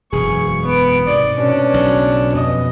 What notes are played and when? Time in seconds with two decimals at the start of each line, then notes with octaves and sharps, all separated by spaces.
0.12 E1 F#2 B2 G#4 C#6
0.65 B3 D7
1.06 G#2 C3 D5
1.38 B2 C#4 D4
1.74 B1 C#3
2.35 F2 B3 D#5